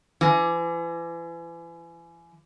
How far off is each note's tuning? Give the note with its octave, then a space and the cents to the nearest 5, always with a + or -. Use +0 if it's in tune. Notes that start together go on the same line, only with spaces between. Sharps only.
E3 +35